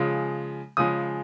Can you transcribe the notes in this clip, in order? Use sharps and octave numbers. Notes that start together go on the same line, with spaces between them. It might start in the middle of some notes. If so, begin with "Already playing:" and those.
Already playing: C#3 F3 G#3
C#3 F3 G#3 D#6